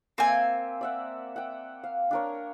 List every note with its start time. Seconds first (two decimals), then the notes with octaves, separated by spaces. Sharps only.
0.18 A#3 C4 E5 G#5
0.81 D5 E5 F#5
1.36 F#5 G5
1.84 F5
2.11 D4 A#4 C#5